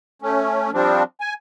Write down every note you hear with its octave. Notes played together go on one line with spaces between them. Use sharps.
A3 C#4
F3 G3 C4 D4
G#5